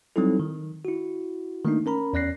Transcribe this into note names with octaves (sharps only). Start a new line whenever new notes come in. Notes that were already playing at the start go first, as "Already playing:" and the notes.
F#3 G3 C4 D#4 E4 A4
D#3
E4 F#4
D#3 A3 A#3 D4 D#4
C#4 A#4 A#5 B5
E2 C#4 D5 F#6 A#6 C7